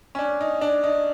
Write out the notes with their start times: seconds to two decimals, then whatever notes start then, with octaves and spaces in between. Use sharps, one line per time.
0.15 C#4
0.19 D4
0.41 D#4
0.61 D4
0.84 D#4